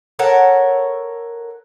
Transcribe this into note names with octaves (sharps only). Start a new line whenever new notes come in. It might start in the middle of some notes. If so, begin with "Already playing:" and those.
A4 A#4 C#5 F#5